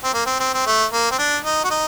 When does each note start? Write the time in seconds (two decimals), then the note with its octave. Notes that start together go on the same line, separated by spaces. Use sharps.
0.04 C4
0.14 A#3
0.26 C4
0.40 C4
0.54 C4
0.66 A3
0.93 A#3
1.12 C4
1.19 D4
1.44 D#4
1.64 F#4
1.70 D#4